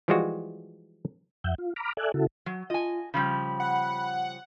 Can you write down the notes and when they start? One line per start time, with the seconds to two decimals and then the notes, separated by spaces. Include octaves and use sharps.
0.08 E3 F3 G3 G#3 F4 F#4
1.44 F2 E5 F#5 G6
1.58 F4
1.76 A#5 B5 D6 F6
1.97 A4 D5 E5 G#5 F#6
2.14 C#3 E4 F#4 A4
2.46 F#3
2.70 F4 D#5 G#5
3.14 C#3 F3 G3 B5
3.60 F#5